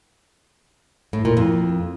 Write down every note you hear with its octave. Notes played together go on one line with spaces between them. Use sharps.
A2
A#2
F2